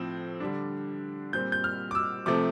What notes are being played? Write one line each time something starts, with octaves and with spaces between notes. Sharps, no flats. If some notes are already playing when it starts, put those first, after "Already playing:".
Already playing: A2 F3 C4
D3 G3 D4
A#2 G3 C4 G6
G6
F6
D6
E6
C3 F3 A3 C4 D6